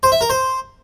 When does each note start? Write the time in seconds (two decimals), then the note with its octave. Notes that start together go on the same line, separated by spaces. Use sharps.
0.03 C5
0.12 E5
0.21 A#4
0.30 C5